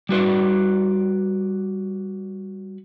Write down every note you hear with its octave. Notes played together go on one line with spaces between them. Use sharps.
G3 F#4 B4 D5